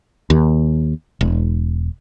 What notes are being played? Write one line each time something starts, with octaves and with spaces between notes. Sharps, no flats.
D#2
E1